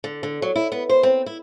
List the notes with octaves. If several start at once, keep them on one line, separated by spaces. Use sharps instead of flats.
D3
D3
F#3
E4
B3
C5
C4
E4